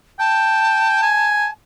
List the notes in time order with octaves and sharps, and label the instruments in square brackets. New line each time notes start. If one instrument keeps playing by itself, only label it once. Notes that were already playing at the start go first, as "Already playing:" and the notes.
[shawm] G5 [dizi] A5
[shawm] G#5